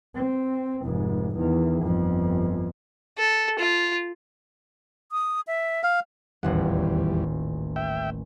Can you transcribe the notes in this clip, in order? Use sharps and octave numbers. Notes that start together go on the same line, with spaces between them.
C4
F1 G#2
E2 D#3
G1 F2
A4
F4
D#6
E5
F5
D#1 A1 E2 G3 F#5
E5 G5